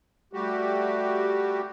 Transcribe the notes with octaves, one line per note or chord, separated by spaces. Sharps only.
G3 A3 F#4 G4